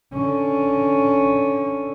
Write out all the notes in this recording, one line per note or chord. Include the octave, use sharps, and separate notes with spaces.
D3 C#4